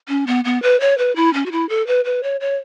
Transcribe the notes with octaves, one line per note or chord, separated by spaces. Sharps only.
C#4
B3
B3
B4
C#5
B4
E4
C#4
F#4
E4
A4
B4
B4
C#5
C#5